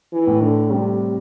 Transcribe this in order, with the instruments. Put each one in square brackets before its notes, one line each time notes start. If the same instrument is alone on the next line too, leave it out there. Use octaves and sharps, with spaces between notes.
[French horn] E3
[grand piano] A2
[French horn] D3
[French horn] C3 [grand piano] G3